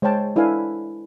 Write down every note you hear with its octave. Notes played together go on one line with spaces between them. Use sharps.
G#3 C5 C#5 G5 A5
D4 E4 A4 B4 F5 G#5